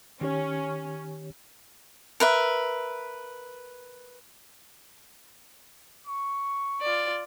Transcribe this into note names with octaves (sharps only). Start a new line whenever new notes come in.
D#3 C#4 G4 C#5
A#4 B4 E5
C#6
F4 D5